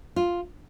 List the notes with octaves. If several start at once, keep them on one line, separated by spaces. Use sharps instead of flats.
F4